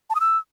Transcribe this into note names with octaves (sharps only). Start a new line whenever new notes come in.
A5
D#6
E6